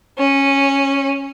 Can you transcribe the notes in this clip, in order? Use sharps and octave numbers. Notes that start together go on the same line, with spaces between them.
C#4